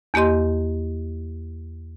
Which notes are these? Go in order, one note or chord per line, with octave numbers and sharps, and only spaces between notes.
E2 A#3 G4 D#5 C6